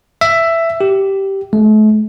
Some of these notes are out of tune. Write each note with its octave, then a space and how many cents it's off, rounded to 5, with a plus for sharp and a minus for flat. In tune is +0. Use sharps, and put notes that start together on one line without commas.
E5 +10
G4 -10
A3 -40